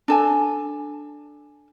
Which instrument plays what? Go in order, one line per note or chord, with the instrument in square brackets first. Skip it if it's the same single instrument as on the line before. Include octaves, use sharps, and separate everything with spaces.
[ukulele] D4 A4 G#5